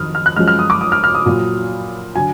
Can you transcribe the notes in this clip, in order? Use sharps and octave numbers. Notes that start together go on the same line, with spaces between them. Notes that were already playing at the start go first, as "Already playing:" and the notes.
Already playing: F2 D#3 F#3 D#6 F6
F6
F#6
F#2 F3 G#3 F6
F6
D#6
D6
D#6
F6
F6
D#6
A#2 F#3
D3 F#3 G#5